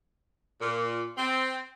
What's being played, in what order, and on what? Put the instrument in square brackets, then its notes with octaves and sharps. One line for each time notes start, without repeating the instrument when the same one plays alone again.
[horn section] A#2
C4